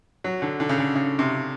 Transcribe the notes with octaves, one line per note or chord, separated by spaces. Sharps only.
F#3
D3
D3
C#3
D3
C#3
C3